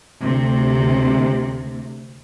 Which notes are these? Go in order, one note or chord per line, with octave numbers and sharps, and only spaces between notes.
D2 C3